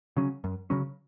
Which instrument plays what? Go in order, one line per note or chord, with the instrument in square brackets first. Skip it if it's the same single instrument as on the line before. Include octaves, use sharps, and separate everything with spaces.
[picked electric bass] C#3 F#3 C#4
F#2
C#3 F#3 C#4